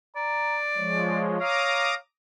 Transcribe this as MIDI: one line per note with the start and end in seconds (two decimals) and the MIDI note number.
0.16 1.30 74
0.16 0.58 82
0.76 1.38 53
0.76 1.38 56
0.76 1.99 73
1.41 1.94 77
1.41 1.95 82
1.41 1.95 86
1.41 1.95 87